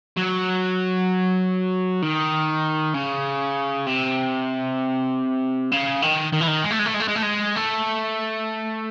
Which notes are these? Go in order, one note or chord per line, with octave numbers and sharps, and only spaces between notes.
F#3
D#3
C#3
C3
C#3
D#3
D#3
E3
D#3
G#3
A3
G#3
A3
G#3
A3
G#3
A3
G#3
A3